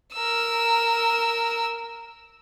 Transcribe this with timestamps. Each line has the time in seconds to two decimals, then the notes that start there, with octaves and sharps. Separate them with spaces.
0.14 A#4 E6